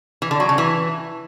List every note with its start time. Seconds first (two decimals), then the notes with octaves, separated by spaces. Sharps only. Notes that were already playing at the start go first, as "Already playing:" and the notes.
0.22 E3
0.31 D3
0.40 F#3
0.49 C#3
0.58 E3